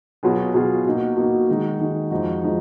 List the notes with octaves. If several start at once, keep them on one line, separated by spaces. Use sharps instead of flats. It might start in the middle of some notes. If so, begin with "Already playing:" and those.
B2 F#3 B3 F4 G#4
B2 F#3 B3 F4 G#4
B2 A#3 D#4 F#4
B2 A#3 D#4 F#4
D#3 G#3 D#4 F#4
D#3 G#3 D#4 F#4
F2 F3 G#3 D#4 F#4
F3 G#3 D#4